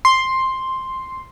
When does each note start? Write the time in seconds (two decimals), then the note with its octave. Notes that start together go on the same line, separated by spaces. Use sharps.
0.05 C6